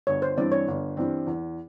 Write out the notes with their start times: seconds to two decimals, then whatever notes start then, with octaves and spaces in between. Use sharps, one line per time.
0.07 G1 C#5
0.22 C5
0.37 G2 E3 G3 C4 D5
0.52 C#5
0.68 G1
0.97 G2 E3 G3 C4
1.27 E2